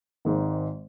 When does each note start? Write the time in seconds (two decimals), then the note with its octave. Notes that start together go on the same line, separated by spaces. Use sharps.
0.25 G#1 G#2 D#3